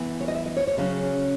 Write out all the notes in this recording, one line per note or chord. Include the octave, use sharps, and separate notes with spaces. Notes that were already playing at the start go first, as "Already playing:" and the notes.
Already playing: E3 B3
C#5
D#5
E5
D#5
C#5
C#5
C#3 F#3 C#4 G#4